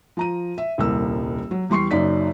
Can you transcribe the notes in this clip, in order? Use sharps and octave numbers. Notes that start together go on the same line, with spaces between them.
F3 A#5 D#7
E5
D#1 C2 A#3 E6
F#3
E2 G3 C6 C#6 C7
F#1 F#2 D#4 D5 B6